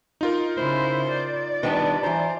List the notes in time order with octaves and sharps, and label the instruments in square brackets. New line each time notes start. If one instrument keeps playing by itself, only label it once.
[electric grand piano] D#4 F4 A#4
[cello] C#3 E4 [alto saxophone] C5
[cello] D5
[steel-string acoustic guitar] D#3 G3 D4 [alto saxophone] B3
[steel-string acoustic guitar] E3 A#5 [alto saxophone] C5